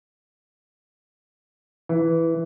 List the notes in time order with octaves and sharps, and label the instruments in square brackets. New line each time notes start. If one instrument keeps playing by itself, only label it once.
[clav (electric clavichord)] E3